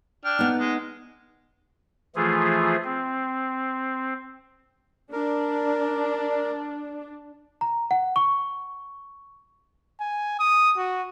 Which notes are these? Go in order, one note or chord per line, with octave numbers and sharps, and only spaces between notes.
D4 G5 F6
B3 D#4
G#3
E3 F3 A3 F4 G#4
C4
D4 A#4
A#5
F#5
C#6
G#5
D#6
F#4